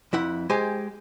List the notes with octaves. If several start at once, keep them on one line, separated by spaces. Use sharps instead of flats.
F2 E4 F#5
G#3 G4 C5 G#5